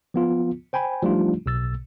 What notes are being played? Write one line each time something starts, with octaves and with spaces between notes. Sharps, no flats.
F3 B3 F4
C5 G5 G#5 B5
F3 G3 A3 D4 D#4 F4
B1 B2 E6 A6